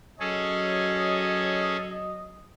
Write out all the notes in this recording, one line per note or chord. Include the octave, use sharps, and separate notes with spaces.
F#3 C#4 G#4 A4 D#5